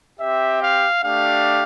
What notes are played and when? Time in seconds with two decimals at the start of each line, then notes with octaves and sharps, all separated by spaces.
0.19 C4 G4 E5
0.62 F5
1.03 A3 D4 G4 F5